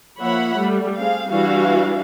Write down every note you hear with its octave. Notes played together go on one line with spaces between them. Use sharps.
F3 A#3 C#5 E5 F#5 B5
G3 A3
C4 G#4 F5
E3 G3 D4 E4 F#4 F5